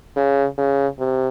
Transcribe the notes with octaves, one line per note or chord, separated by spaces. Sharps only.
C#3
C#3
C3